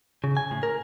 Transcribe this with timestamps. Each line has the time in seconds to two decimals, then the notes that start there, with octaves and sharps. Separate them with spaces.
0.24 C#3
0.37 G#5
0.51 A2
0.63 A#4